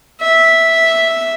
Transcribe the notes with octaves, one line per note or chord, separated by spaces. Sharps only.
E5